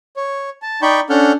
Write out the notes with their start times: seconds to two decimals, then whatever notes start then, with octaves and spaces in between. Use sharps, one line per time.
0.16 C#5
0.62 A5
0.82 D#4 D5 G5 B5 C#6 G6
1.10 C#4 D4 A4 F#5 F6 G6